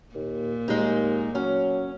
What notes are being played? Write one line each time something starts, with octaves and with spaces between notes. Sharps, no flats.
D#2 A#2
D#2 G#3 D#4
F#3 C#4